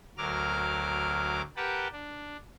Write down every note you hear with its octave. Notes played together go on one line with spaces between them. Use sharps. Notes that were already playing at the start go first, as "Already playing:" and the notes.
D2 F#3 A#4 D6 F6
G4 A#4 B4 F#5 G5 A5
D4